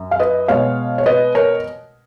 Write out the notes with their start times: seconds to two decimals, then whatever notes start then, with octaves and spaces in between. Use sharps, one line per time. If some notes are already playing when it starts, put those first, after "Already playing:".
Already playing: F#2
0.11 F5
0.19 B4 D#5
0.48 B2 G#3 B3 C#5 F5
0.98 C#5
1.06 B4 D#5
1.35 A#4 C#5